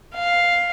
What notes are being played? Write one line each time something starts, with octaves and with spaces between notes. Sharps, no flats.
F5